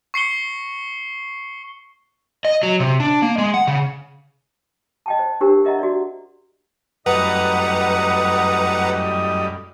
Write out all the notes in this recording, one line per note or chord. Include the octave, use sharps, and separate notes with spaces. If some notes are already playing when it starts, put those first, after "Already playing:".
C#6 C7 C#7 G7
D#5
F#3
C3
D4
A#3
G#3
F#5
C#3
D#5 G5 A5
C5
D4 G4 A#4 C5
A#4 D#5 E5 F#5 A#5
F#4 D5
F#2 A2 G3 B4 D#5 F#5 A#5 D#6